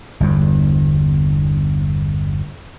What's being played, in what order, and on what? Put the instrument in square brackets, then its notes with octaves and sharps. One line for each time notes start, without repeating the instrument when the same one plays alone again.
[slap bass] G1 E2 G2